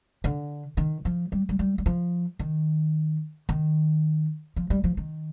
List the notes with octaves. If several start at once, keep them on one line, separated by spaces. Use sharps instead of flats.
D3
D#3
F3
G3
G3
G3
G3
F3
D#3
D#3
F3
G3
F3
D#3